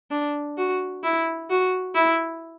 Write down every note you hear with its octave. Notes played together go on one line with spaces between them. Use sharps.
D4
F#4
E4
F#4
E4